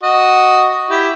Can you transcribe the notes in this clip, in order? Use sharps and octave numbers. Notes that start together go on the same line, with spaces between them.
F#4 D#5
E4 G4